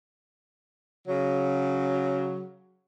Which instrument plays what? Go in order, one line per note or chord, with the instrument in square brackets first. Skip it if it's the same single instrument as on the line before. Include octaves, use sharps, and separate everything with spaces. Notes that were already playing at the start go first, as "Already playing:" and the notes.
[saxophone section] C#3 F#3